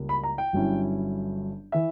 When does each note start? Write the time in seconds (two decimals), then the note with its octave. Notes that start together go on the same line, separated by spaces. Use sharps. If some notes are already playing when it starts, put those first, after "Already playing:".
Already playing: C#2 C#3 G3 A#3
0.09 B5
0.23 A#5
0.38 G5
0.53 G1 G2 F#3 C#4 E4
1.72 E3 E5